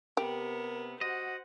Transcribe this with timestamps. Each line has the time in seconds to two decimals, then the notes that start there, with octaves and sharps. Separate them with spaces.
0.17 C3 B3 G4 A#4
1.01 F#4 C5 D#5 F#5